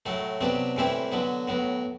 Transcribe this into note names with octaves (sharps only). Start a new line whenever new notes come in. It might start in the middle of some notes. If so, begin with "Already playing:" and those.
A2 F#3 A3
C3 F#3 B3 D4
A2 E3 G3 C4 E4
D3 F#3 B3
A2 F#3 B3